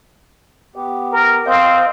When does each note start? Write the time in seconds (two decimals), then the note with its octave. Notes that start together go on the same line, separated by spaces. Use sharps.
0.76 B3 G4
1.12 A#4
1.46 C4 D#5 F5 G6